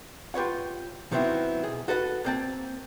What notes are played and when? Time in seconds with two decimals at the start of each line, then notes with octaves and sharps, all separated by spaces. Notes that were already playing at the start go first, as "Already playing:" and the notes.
0.34 F4 G4 B4 C#5 F#5
1.12 D#3 F#3 B3 C4 E4
1.63 B1 G#4
1.88 F#4 A4 B4 F#5
2.24 A#3 C4 A5